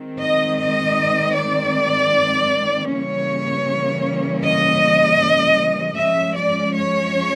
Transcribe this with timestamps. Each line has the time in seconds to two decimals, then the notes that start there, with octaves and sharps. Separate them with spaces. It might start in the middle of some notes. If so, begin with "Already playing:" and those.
Already playing: D#3 G#3 C4
0.21 D#5
0.61 D#5
1.37 D5
2.90 C#3 E3 G3 A#3 C#4 C#5
4.44 D#5
5.97 F3 G#3 C#4 E5
6.36 D5
6.74 C#5